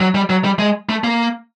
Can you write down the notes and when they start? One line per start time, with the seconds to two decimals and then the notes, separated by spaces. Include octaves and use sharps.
0.01 F#3
0.15 G3
0.30 F#3
0.44 G3
0.59 G#3
0.89 A3
1.04 A#3